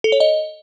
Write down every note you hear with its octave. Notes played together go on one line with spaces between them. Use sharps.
A4
C#5
D#5